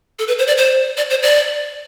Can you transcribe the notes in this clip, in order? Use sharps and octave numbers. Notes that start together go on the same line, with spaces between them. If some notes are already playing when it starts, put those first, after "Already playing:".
A4
B4
C5
D5
C5
D5
C5
D5